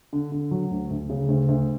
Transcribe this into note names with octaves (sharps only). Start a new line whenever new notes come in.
D3
D3
F#3
D2
D2
C#3
D2
D2